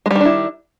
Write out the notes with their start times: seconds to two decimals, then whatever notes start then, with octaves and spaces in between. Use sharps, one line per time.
0.06 G#3
0.11 G3
0.15 D#3
0.20 D4
0.25 E4